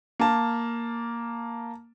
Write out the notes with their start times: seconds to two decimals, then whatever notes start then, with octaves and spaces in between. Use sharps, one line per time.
0.19 A#3 A5